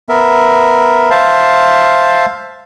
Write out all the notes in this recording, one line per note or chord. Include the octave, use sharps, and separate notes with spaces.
B3 A#4 E5
C5 E5 F5 A5